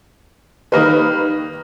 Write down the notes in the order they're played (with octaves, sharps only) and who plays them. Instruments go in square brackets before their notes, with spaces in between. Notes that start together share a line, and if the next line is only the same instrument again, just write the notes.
[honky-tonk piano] D#3 B4 [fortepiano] G3 A#3 D#5